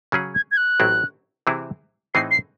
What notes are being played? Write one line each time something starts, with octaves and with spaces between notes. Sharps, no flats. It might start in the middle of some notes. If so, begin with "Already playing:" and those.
C#3 F#3 C#4 G#4
G#6
G#6
F#6
A1 A2 F#3 C4 E4
C3 E3 C4 E4 G#4
A2 E3 C4 D#4 G#4 C7
C7